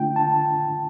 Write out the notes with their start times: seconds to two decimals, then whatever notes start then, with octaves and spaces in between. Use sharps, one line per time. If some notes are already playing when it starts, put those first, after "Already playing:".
Already playing: D3 A3 D4 F4 G5
0.16 A5